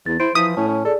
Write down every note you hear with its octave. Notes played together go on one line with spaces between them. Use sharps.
E2 A6
E4 C5 D7
E3 F3 E4 D#6 B6
A2 C#4 A5
C#4
G#4 A4 D5